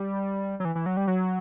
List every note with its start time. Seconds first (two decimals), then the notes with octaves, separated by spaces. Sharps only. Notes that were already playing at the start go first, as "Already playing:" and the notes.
Already playing: G3
0.60 F#3
0.65 E3
0.75 E3
0.86 F#3
0.97 G3
1.07 F#3